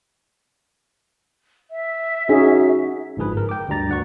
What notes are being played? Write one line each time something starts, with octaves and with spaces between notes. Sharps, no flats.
E5
C#4 D#4 F#4 G#4
G1 G#2 F3 G#4 B4
A#4
G5 D6
D2 G2 G3 A#5 A6
D2 F#5 C#6